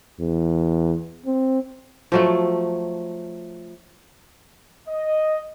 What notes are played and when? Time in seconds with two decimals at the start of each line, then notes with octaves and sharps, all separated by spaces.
0.20 E2
1.26 C4
2.12 F3 F#3 A3
4.89 D#5